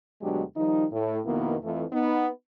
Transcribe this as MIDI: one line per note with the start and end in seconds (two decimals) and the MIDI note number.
0.21 0.43 38
0.21 0.43 47
0.21 0.43 54
0.21 0.43 56
0.21 0.43 62
0.21 0.43 67
0.56 0.85 51
0.56 0.85 53
0.56 0.85 55
0.56 0.85 63
0.92 1.20 45
1.26 1.56 41
1.26 1.56 47
1.26 1.56 51
1.26 1.56 58
1.26 1.56 59
1.26 1.56 64
1.63 1.85 41
1.63 1.85 52
1.63 1.85 57
1.92 2.28 59
1.92 2.28 63